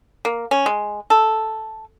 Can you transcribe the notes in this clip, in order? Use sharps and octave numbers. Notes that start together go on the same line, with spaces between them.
A#3
C#4
G#3
A4